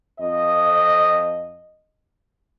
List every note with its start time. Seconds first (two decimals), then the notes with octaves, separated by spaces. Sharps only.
0.20 F2 D#5